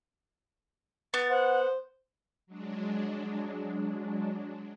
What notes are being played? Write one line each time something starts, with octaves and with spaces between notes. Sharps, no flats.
B3 A6
C5 F#5
F#3 G#3 D4